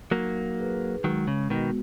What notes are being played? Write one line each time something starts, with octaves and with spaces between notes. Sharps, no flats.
F#3 A#3 D#4
G#4 B4
D#3 F#3 G#3
C#3
B2 D#3 B3 F#4